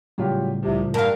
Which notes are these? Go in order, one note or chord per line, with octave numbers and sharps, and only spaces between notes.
A2 C#3 F#3 G3 F4 G4
C2 C3 F3
G2 A#4 F5 A5